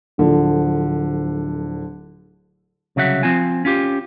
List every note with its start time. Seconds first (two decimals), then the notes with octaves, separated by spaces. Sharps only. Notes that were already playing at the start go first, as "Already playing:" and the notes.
0.18 D1 D3 F3
2.96 C2 C#3 F#3 E5 F#5
3.23 F3 C4 F4 G#5
3.65 C#4 F4 G4